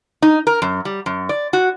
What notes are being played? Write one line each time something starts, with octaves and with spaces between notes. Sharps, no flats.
D#4
A#4
F#2
G3
F#2
D5
F#4